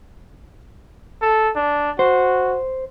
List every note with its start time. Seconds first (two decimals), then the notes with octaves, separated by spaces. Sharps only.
1.22 A4
1.56 D4
1.99 F#4 C5